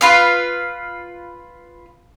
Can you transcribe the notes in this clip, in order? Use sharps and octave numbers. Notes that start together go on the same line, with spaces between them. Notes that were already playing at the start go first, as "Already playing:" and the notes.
F4 B4 F5